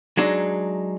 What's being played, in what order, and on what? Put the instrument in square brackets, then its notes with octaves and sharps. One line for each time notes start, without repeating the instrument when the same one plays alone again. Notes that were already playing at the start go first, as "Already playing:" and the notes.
[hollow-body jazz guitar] F#3 G#3 D4 D#4